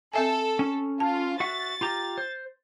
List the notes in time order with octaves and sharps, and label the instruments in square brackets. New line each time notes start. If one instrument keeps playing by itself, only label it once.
[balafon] C4 E5 G#5 [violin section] A4
[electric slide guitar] C#4 [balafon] C#6
[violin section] F4 [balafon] A5
[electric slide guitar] F#4 E5 F#5 [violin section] A6
[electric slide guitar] F4 G4 A#5
C5